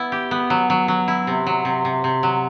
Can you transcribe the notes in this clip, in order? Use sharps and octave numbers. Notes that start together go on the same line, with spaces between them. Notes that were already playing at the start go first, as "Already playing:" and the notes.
Already playing: B3 E4
G4
B3
F#3
F#3
F#3
E4
C3
F#3
C3
C3
C3
F#3